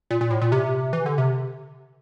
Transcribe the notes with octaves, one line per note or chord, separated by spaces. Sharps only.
A#2
A#2
A2
A#2
C3
E3
D3
C3